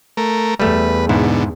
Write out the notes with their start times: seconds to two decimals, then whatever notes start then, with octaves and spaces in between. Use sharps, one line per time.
0.17 A3 A#4
0.60 E2 G3 A3 B4
1.09 G#2 B2 D3 E4